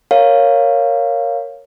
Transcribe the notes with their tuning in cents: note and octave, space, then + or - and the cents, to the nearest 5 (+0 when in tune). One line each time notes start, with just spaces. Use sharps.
A#4 +0 C#5 +0 F5 +0